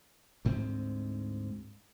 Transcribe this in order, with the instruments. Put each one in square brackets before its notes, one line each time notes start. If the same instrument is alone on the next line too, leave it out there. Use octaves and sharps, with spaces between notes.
[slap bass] D2 G#2 C4